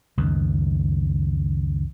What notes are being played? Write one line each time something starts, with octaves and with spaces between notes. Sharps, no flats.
C#2 F#2 D#3